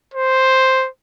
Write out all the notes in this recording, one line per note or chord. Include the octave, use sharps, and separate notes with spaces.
C5